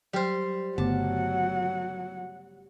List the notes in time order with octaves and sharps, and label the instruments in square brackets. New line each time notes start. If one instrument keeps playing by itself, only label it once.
[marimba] F#3 G5 F6 [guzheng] G3 C5
[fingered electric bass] G1 [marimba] C#3 A3 B3 [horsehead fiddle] F#3 F#5 [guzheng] A5